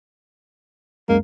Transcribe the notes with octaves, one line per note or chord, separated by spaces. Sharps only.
C#2 F#2 G#3 A#3